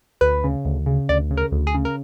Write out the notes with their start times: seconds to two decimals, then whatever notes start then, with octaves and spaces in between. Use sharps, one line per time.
0.21 D2 B4
0.44 C#3
0.65 D2
0.86 C#3
1.09 D2 D5
1.31 C#3
1.37 A#4
1.52 D2
1.67 G#4
1.75 C#3
1.85 A#4